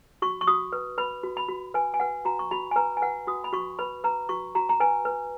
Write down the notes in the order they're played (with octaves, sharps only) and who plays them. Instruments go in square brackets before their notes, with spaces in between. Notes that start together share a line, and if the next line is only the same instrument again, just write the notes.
[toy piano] F#4 C#6
C#6
F#4 D#6
B4
B4 B5
F#4
B5
F#4
B4 G#5
G#5
B4 F#5
F#4 A#5
C#6
F#4 B5
G#5
B4 A#5
G#5
B4 F#5
F#4 D#6
B5
F#4 C#6
B4 B5
B4 A#5
F#4 C#6
F#4 A#5
A#5
B4 G#5
B4